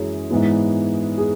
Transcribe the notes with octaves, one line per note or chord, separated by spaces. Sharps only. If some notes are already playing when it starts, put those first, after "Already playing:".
Already playing: F#2 E3 G#3 G#4
G#2 E3 B3
G#4